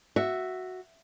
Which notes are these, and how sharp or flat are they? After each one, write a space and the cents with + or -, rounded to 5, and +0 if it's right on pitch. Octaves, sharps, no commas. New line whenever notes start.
F#4 +0 E5 +0